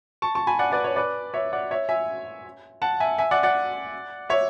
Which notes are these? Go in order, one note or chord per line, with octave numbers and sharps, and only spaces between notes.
A5 C#6
A5 C#6
G#5 B5
D5 F#5
B4 D5
C#5
B4 D5
C#5 E5
D5 F#5
C#5 E5
E5 G#5
F#5 A5
E5 G#5
E5 G#5
D5 F#5
D5 F#5
C#5 E5